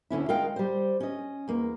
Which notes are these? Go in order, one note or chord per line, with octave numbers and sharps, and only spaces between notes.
D2 D3 C#4 E4
G#3 A#4 D#5 F5 G5
G3 C5
C#4 D#5
E2 A#3